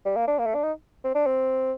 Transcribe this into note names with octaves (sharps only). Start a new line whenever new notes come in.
G3
A#3
D4
A#3
A3
D4
D#4
C4
D4
C4